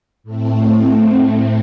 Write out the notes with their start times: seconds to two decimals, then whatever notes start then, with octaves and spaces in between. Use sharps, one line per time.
0.23 A2 A3 C4